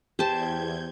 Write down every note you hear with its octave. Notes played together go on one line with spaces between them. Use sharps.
E2 G4 C5 A5 G6 G#6